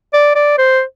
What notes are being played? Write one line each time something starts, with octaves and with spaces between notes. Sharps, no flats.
D5
D5
C5